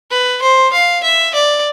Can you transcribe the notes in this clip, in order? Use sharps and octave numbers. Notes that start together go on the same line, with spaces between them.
B4
C5
F5
E5
D5